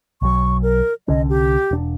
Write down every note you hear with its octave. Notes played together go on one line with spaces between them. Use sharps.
B1 F#3 C#6
A#4
C2 D3 C#4 D#5
G4
E1 D4